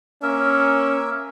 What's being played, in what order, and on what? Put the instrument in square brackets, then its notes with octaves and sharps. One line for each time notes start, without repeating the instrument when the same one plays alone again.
[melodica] A#3 A#4 E5 [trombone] C#4